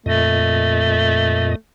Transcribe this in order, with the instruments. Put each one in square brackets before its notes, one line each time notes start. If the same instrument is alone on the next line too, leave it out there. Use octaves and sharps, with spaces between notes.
[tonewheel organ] F2 A#2 D#5 [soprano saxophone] A3